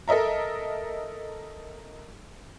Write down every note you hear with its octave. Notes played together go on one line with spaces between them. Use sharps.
A4 A#4 D#5 E5 A#5